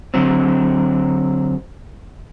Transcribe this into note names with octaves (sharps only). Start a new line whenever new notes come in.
D3 F#3 C4